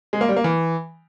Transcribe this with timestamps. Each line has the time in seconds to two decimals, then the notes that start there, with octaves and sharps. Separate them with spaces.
0.13 G#3
0.21 A#3
0.29 G3
0.36 A#3
0.44 E3